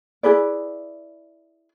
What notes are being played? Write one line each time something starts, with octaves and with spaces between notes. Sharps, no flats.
E4 G#4 B4 D5